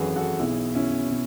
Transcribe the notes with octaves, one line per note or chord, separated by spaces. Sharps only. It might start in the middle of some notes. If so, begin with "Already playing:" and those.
Already playing: G#1 F#2 E3 F#4 G#4 A4 B4
F#4 A4
B1 B2 E4 G#4
C#4 E4
B2